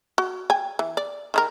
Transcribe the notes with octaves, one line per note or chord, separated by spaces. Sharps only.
F#4
G5 G#5
E3
D5
D#3 E4 A#4